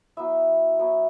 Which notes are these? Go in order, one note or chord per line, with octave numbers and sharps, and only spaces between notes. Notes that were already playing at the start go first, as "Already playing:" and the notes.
F#3 B3 E4 E5
F#3 B3 E4 C#5